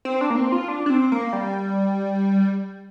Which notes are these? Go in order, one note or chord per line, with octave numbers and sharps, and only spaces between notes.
C4
D4
A#3
C4
F4
D4
D4
C4
A#3
G3